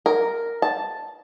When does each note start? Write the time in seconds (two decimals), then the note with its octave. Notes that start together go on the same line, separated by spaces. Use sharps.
0.06 A#4
0.62 A5